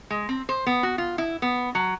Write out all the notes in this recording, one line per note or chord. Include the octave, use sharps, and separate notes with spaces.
G#3
C4
C5
B3
F#4
F4
E4
B3
F#3